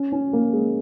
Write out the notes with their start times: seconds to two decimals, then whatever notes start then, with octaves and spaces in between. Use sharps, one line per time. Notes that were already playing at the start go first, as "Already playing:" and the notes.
Already playing: C#4
0.12 C#4
0.33 A#3
0.53 G#3